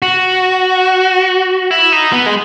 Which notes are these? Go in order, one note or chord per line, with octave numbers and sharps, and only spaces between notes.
F#4
E4
D#4
B3
G#3